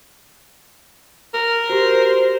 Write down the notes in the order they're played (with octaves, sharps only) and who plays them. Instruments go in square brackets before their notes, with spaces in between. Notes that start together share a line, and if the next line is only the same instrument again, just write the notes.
[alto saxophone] A#4
[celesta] F#4 G4 [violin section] C5